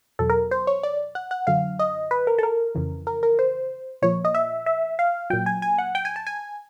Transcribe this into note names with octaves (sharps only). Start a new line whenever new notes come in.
E2 B2 F#3 A4
A#4
C5
C#5
D5
F#5
F#5
F#2 D3 F#3 F5
D#5
B4
A#4
A4
A#4
F2 C#3 E3
A#4
A#4
C5
A#2 F3 C#5
D#5
E5
E5
F5
A#2 F#3 G5
G#5
G#5
F#5
G5
G#5
A5
G#5